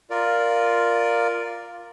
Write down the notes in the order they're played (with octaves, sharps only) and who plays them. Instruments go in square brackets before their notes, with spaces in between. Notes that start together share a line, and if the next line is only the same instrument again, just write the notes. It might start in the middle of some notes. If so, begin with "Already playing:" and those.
[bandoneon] F4 A#4 D5